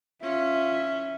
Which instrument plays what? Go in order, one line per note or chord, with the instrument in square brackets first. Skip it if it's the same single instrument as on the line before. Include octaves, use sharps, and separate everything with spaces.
[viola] C#4 [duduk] F4 [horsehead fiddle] E5